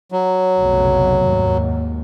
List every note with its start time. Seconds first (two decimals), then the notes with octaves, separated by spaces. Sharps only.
0.12 F#3
0.57 F1 B1 C#3
1.26 D#2 G#2